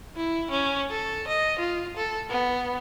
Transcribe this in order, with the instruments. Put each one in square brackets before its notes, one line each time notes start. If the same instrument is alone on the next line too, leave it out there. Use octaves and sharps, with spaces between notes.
[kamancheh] E4
C#4
A4
D#5
F4
A4
B3